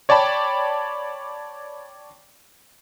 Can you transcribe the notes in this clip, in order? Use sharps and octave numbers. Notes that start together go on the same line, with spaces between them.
C#5 D5 G5 A5 B5